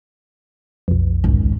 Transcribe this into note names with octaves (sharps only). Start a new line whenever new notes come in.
B1 F2
G#1 C#2